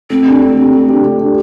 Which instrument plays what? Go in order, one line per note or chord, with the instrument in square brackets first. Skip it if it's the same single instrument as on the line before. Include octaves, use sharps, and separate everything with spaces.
[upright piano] A3 [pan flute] C4
[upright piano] D4 G4
A3
D4 G4
A3
D4 G4
A3
D4 G4